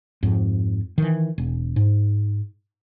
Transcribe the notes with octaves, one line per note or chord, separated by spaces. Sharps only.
F2 G#2
D#3 E3
E1
G#2